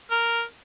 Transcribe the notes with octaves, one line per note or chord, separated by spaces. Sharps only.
A#4